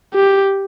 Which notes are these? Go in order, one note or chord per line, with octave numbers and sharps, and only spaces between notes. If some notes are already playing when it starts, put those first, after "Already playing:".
G4